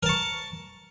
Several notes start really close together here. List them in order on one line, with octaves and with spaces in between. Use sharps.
A#4 A5 C#6